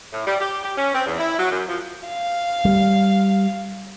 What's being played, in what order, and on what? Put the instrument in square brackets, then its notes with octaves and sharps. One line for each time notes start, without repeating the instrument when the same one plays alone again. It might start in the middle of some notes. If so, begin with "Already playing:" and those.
[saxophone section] A2
G3
G4
G4
C#4
C4
E2
E4
F#3
F#2
F3
[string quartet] F5
[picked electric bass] G3